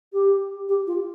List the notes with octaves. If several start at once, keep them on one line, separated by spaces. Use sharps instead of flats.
G4
G4
F4